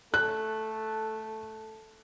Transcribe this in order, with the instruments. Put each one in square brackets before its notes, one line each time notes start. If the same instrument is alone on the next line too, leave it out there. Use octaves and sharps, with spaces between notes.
[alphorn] A3 [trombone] A4 [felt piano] F#6